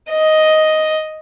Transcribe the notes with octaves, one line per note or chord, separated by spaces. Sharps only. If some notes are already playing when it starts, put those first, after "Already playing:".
D#5